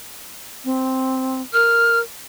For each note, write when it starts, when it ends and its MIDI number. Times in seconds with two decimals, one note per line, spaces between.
0.65 1.41 60
1.53 2.02 70
1.53 1.99 89